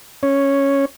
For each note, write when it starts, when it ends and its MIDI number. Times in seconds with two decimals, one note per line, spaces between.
0.23 0.85 61
0.23 0.85 73